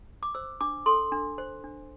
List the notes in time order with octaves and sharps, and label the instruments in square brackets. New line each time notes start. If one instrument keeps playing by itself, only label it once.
[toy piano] D6
C5 E6
D4 D6
A4 C6
D4
C5
D4